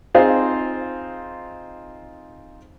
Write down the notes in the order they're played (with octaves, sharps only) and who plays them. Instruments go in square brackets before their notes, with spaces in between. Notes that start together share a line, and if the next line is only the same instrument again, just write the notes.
[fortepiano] C4 D#4 F4 G#4 C5